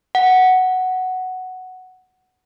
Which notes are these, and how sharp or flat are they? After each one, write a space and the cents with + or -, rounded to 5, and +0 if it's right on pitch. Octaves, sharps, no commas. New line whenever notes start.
F#5 +5